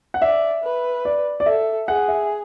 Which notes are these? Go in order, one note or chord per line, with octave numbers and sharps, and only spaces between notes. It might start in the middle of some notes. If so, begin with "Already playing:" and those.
F#5
D5 E5
B4
D5
D5
A4 E5
G#4 F#5
E5